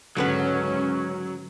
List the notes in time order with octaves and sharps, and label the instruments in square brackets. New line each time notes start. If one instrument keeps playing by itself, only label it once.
[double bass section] C#2 G#2 C#4 [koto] D3 B3 B4 [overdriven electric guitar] F#3